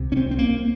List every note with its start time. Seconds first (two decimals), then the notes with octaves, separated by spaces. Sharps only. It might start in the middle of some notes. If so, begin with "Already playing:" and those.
Already playing: C2 C3
0.12 C#4
0.17 C4
0.31 C4
0.38 A#3